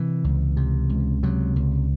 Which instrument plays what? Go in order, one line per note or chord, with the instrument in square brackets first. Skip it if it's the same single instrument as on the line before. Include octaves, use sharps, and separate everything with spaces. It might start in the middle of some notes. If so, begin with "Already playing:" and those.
Already playing: [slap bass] C3 E3
C#2
C3
C#2
C3 F#3
C#2